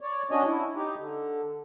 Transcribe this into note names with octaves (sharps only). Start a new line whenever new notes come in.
C#5 D5
C#4 D4 F#4 C#5 D#5 G#5
E4
D#4 G4
D3